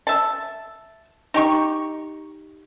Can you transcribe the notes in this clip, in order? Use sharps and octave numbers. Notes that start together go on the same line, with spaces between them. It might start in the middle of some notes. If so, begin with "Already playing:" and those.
E5 A5
D#4 G4 C#6